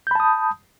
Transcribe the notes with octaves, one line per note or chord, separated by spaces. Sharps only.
A5 B5 D#6 G6